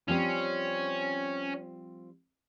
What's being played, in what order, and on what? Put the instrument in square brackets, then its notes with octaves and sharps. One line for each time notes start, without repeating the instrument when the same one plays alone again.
[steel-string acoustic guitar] F3 G3 C4 [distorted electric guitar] C#4